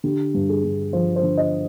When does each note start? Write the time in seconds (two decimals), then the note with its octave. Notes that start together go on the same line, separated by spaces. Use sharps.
0.04 D3 G4
0.34 G2
0.49 G#4
0.64 G2
0.93 F3 C5
1.16 C5
1.23 D3
1.37 D#5